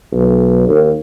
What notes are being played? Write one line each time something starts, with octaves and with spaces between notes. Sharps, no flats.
B1
D#2